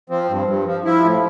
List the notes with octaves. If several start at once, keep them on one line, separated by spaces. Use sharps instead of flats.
F3 C4
G2
G2
F3
F3 E4
A2